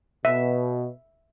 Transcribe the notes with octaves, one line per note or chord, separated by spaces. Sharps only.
B2 E5